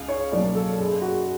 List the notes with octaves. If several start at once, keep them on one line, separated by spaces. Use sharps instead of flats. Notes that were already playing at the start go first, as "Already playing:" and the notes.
Already playing: C#2 F5
C#5
B2 F#3 A#3 D5
A4
F#1 G#4
F#4